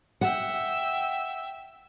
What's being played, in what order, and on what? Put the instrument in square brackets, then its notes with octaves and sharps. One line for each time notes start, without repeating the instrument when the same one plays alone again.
[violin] E5 G5 [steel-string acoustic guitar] F#5